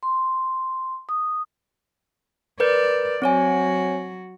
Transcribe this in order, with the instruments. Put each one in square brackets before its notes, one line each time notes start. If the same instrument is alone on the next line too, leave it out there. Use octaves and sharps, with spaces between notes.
[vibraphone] C6
D#6
[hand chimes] A#4 B4 G6 [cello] D5
[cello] F#3 F#4 [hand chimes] C4 C#5 G#5